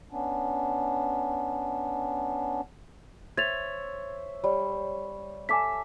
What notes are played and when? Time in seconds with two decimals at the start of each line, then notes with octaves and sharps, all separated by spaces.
0.11 B3 C#4 D4
3.37 C5 C#5 E5 G#6 A6 F7
4.44 G3 C#5
5.49 A4 E5 G#5 D6 E6 B6